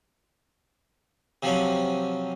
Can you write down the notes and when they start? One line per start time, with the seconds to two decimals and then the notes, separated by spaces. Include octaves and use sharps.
1.43 C3 F3 F#3 C#4